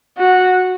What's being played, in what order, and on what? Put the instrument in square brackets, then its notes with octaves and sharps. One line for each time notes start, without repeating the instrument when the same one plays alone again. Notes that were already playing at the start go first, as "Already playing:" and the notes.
[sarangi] F#4